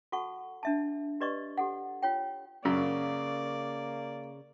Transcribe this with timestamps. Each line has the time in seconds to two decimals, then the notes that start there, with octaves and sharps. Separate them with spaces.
0.12 F#4 A4 F#5 A5 C#6
0.63 D4 E5 A5
1.21 G4 B4 D5 D#5 C#6
1.58 G4 A4 F#5
2.03 F4 C#5 G5
2.65 F#2 C#3 A#3 D5